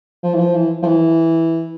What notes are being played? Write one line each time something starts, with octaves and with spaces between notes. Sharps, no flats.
F3
E3
F3
E3
F3
E3